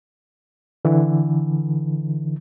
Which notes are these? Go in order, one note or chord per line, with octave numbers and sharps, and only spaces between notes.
D3 E3